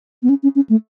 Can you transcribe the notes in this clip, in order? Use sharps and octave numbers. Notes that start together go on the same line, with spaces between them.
B3
C#4
C#4
C#4
A3